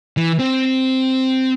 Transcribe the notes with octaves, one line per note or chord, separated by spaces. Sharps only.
E3
C4